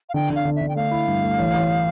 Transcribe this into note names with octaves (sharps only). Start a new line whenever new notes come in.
F5
D3 G5
D3
F5
D3
E5
D3
G5
A3 F5
E4
G2
A3
A1
A1